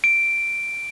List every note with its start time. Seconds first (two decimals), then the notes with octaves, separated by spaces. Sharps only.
0.04 D7